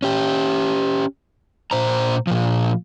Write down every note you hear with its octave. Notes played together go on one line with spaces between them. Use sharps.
C#4 G4
A#2 C5 A#5
A#2 F3